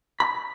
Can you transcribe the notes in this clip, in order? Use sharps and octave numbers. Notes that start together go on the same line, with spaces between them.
B5